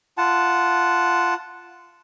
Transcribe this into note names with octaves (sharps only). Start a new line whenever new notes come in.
F4 F#5 A5